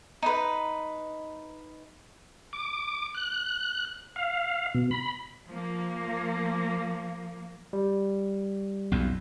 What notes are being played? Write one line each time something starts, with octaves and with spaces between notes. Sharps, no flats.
D#4 B4
D6
F#6
F5
B2
B5
F3 A#3
G3
B1 F2